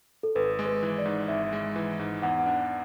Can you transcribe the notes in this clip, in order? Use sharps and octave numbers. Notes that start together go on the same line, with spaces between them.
A4
G#1 B4
G#3
B4
E3
D5
G#2
G#1 E5
G#3
E3
G#2
E2 F#5
D4